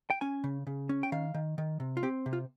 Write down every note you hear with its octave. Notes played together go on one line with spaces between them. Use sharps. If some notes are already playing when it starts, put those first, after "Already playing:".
G5
C#4 G#5
C#3
C#3
C#4
G5
D#3 F5
D#3
D#3
C3
F4
C4 G4
C3
F4